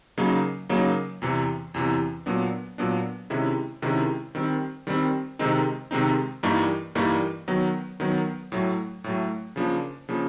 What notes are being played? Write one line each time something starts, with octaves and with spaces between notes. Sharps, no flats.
C#3 F#3 A#3 D#4
C#3 F#3 A#3 D#4
E2 C3 E3
E2 C3 E3
A#2 F#3 B3 D4
A#2 F#3 B3 D4
C3 D#3 G#3 C#4 E4
C3 D#3 G#3 C#4 E4
D#3 G3 C4
D#3 G3 C4
C3 D#3 G#3 C4 D#4
C3 D#3 G#3 C4 D#4
G2 E3 G3 A#3 D#4
G2 E3 G3 A#3 D#4
D#3 F#3 B3
D#3 F#3 B3
A2 F#3 A3
A2 F#3 A3
C#3 F3 A#3 D4
C#3 F3 A#3 D4